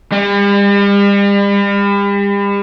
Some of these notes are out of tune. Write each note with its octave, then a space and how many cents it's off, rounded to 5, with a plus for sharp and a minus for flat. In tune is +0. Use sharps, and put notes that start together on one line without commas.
G3 +40